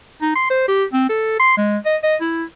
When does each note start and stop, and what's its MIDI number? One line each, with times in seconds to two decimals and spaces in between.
0.22 0.35 63
0.35 0.47 84
0.50 0.67 72
0.68 0.84 67
0.93 1.08 60
1.10 1.35 69
1.40 1.55 84
1.58 1.78 56
1.85 1.97 75
2.03 2.16 75
2.21 2.44 64